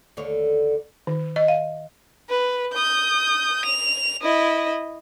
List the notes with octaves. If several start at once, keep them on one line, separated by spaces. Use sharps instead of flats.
D#2 D3 C#5
D#3
D#5
F5
B4
D#6 G6
F7
E4 D#5